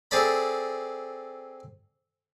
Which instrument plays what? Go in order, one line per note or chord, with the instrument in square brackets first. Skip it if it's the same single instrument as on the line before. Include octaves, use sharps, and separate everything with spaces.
[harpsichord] C4 G#4 A4 D5 A#5 B5